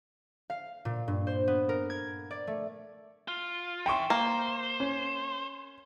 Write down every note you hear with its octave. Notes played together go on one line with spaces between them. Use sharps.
F5
A#2
G2
C5
B3
A#4
G#6
D5
A3
F4
E3 E5 G5 C6 C#6
A#3 C5
C#4